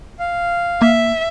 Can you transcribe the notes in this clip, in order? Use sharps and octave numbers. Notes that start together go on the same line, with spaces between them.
F5
A#3 E5